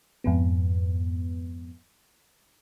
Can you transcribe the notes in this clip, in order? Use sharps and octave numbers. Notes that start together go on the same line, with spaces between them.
F2 G#2 B3